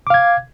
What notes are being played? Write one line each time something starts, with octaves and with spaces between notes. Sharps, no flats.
F5 D6 G#6